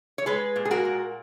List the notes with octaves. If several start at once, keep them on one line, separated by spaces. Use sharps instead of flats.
C#5
G#3 G#4 B4
A#2
G#4
F#4 A#4
A#2